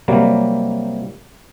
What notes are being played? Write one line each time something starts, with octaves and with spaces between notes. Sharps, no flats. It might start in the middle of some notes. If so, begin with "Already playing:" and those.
C3 F#3 G3 A#3